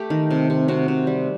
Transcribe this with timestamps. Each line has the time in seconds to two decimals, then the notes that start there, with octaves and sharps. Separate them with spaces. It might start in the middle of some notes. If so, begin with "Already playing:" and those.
Already playing: A3 G4
0.10 D#3
0.31 C3
0.50 C3
0.68 C3 F#4
0.88 C3
1.07 G3